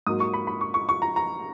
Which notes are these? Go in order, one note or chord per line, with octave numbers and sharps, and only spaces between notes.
G#2 F#3 A#3 D#6
C#6
B5
B5
C#6
C#6
C#6
A#5
A#5